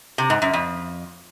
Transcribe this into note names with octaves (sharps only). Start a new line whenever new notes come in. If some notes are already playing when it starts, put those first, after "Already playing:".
C3
G#2
F#2
F2